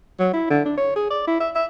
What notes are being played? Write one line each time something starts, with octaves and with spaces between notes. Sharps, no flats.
F#3
E4
D3
D4
C#5
G#4
D5
E4
E5
E5